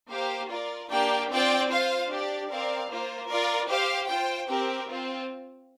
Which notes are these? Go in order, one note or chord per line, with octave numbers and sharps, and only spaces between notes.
A#3 G4 C5 F5
F4 A#4 D5
A#3 D4 G4 D5 G5
C4 F4 D5 G5
F4 C5 F5
D4 G4 D5
C4 A#4 D5 F5
A#3 F4 C5
F4 A#4 D5
G4 C5 F5
F4 C5 G5
C4 G4 A#4 G5
C4 F4